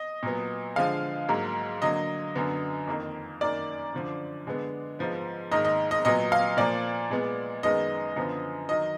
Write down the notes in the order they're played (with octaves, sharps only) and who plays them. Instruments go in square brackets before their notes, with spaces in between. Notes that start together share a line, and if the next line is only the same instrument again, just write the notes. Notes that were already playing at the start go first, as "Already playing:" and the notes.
Already playing: [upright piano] D#5
A#2 F#3 B3
D3 F3 G#3 F5
G#2 F#3 A#3
D3 F#3 A#3 D#5
F#2 D3 F#3 B3
F2 D#3 A#3
F#2 D#3 A#3 D5
F#2 D3 F3
D3 G#3 B3
G#2 F3 B3
G#2 D#3 A#3 D#5
D#5
D#5
A#2 F#3 B3 D#5
F5
A#2 F3 A#3 D5
A#2 G#3 B3
F#2 D#3 G#3 B3 D#5
F#2 D3 F3 B3
D#3 F#3 D#5